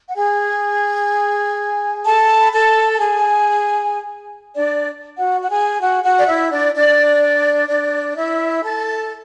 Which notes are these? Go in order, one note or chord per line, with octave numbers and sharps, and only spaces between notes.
F#5
G#4 G#5
A4 A5
B5
A4 A5
A5
G#4 G#5
D4 D5
F#4 F#5
F#5
G#4 G#5
F#4 F#5
F#4 F#5
D5
E4 E5
D4 D5
D4 D5
D4 D5
E4 E5
A4 A5